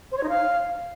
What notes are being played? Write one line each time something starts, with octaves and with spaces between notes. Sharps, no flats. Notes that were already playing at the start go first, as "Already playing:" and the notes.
C5
C#5
D#4
F5